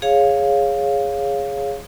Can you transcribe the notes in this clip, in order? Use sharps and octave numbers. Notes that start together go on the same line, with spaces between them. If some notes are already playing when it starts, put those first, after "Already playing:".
G#4 C#5 F5